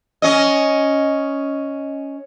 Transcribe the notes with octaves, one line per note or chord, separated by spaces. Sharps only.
C#4 D#5